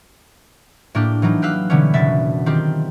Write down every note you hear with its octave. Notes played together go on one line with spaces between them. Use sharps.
A2 A#3 D4 G4
E3 F#3 A#3 D#4
G4 B4 F5 E6 F#6
B2 D3 E3 G3 B3 C#4
F#1 B2 E5 A6 B6
D#3 C4 F4 G4